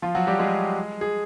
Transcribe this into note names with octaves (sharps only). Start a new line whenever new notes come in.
F3 F4
F#3 F#4
G3 G4
G#3 G#4
G#4